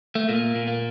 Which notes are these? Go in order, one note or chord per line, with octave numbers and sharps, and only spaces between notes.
A3
A#2 A#3
A#2
A#3